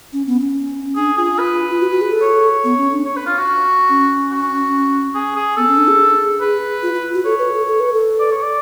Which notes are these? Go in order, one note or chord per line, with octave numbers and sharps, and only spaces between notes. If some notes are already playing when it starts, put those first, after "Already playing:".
C#4
B3
C#4
D4 G#4
F4 G#4
B4
F4
F#4
F#4
G#4
A4
C#5
B3
C#4
D4
C#5
B4
F4
F#4
C#4
F#4
G#4
G#4
B3 A4
C#4
D4
G#4
B4
F4
F4
F#4
A4 C#5
B4
A4
A4
B4
A4
D5
C#5
D5